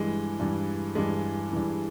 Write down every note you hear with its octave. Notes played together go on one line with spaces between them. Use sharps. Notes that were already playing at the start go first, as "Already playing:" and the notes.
Already playing: G2 E3 G#3
G2 E3
G2 E3 G#3
G2 E3